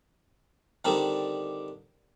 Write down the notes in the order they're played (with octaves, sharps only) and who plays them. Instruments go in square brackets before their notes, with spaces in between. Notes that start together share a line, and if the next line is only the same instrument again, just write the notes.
[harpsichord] D3 D#3 G3 C4 D4 D#4